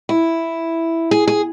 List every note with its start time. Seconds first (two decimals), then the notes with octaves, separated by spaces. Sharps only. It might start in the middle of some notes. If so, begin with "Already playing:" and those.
0.09 E4
1.11 G#4
1.27 G#4